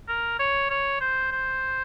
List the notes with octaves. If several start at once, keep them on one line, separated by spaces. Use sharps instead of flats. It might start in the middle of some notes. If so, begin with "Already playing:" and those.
A#4
C#5
C#5
C5
C5